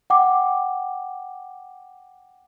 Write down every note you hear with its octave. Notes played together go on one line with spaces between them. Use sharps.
F#5 G5 D6